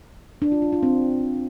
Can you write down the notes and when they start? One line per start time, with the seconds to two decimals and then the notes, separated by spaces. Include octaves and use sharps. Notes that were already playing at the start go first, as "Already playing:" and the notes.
0.42 D4
0.52 F4
0.62 F4
0.72 F4
0.83 C4